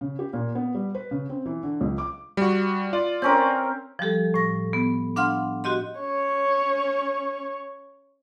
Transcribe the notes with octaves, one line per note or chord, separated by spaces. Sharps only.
C#3
G4
A#2
B3
G3
B4
C#3
C4
E3
D3
C#2
D6
G3 F#4
F4 D5
C4 C#4 A#4
F3 G3 G4 A4
A2 A#6
B3
D4 F5 F#5 C6 F6
F#4 G4 D#5 C6
C#4 C#5